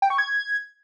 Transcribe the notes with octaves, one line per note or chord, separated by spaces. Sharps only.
G5
C#6
G#6